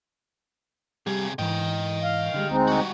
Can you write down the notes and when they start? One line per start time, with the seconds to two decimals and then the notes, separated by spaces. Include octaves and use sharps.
1.07 C3 G3 G#4
1.39 G#2 E3 D#5 G5
2.03 F5
2.34 D3 G3 G#3
2.50 D2 G#3 C4 D#4
2.68 G3 F#4